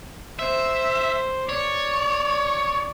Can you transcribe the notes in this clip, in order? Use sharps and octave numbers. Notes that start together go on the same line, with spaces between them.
C5 E5
C#5 D5